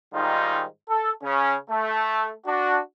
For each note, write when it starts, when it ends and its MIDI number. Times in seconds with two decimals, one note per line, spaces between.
0.13 0.64 44
0.13 0.64 51
0.13 0.64 55
0.13 0.64 63
0.13 0.64 65
0.89 1.11 69
1.23 1.55 49
1.23 1.55 61
1.70 2.31 57
2.46 2.78 62
2.46 2.78 66